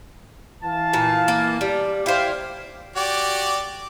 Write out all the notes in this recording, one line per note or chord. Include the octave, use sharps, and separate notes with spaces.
E3 F5 A5
A#2
A#3
G3
E4 C5 D5 F5 G5
F#4 G4 D5